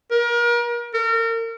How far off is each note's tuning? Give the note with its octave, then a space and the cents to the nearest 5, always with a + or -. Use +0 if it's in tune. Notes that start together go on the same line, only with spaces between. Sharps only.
A#4 +35
A#4 -35